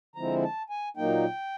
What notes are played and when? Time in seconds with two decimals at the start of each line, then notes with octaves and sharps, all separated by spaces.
0.16 D3 F3 G#3 C4 E4 A#5
0.43 A5
0.70 G#5
0.97 A#2 F#3 A#3 D#4 G5